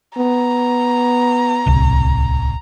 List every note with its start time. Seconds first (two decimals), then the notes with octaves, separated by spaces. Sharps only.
0.17 B3 A#5
1.66 D1 C2